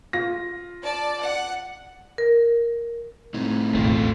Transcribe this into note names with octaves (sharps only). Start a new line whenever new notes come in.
F4 A#6
D5 A5
F#5
A#4
A2 C4 D#4
E1 A1 D#2 A3 F4